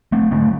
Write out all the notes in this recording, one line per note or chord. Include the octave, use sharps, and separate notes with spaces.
A3 C4
D3 A3 C4